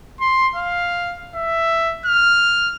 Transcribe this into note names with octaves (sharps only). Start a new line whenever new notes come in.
C6
F5
E5
F6